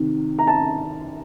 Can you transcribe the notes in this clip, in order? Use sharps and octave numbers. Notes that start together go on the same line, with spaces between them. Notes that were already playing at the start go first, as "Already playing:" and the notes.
Already playing: C3 D#3
A#5
A5